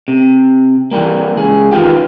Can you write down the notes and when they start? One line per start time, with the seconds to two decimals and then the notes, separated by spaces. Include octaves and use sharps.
0.08 C3
0.91 E3 F3 G3 A#3
1.37 C#2 G#4
1.71 D#3 E3 D#4 F4 G4